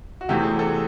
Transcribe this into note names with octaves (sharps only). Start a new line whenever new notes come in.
F#4
E2 C3 E3 A3 G4
G#4
A4